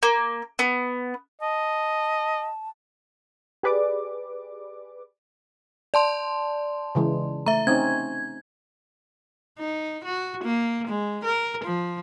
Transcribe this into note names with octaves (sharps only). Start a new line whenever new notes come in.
A#3
B3
D#5 A5
G4 G#4 B4 D5 D6
D5 A5 C6
C#3 E3 G#3
A3 E5 A#5
C4 C#4 D#4 G#6
D#4
F#4
A#3
G#3
A#4
F3